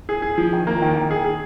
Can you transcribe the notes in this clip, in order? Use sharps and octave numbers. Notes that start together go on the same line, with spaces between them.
G#4
G#4
F3
D#3
A#3
D#3
D#3
G#4
G#4